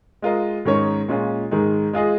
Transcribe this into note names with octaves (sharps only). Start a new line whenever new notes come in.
G#3 F4 A#4 D#5
G#2 D#3 C#4 A#4 C#5
A#2 G#3 C#4 F4
G#2 D#3 G#3
G#3 F4 G#4 D#5